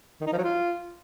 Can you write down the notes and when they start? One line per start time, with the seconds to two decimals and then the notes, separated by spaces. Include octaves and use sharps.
0.21 D#3
0.27 D#4
0.32 F3
0.38 F#3
0.44 F4